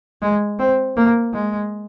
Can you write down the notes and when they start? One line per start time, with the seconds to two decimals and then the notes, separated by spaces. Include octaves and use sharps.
0.22 G#3
0.59 C4
0.96 A#3
1.33 G#3